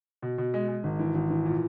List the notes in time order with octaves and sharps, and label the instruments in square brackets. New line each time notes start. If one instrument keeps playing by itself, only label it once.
[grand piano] B2
B2
G#3
G#3
G#1
E3
G#1
E3
A#2